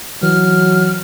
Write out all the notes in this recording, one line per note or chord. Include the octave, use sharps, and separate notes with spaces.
E3 F#3 F6